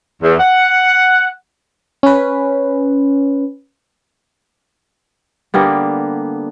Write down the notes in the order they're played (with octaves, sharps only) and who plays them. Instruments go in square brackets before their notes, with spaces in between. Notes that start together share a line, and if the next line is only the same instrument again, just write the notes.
[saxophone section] E2
F#5
[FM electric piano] C#4 B4
[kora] D3 G3 A#3 B3